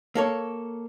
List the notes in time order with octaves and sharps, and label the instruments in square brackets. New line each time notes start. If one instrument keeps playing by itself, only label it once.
[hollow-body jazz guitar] A#3 A4 C#5